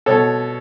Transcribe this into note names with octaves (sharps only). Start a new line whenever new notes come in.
B2 A4 C#5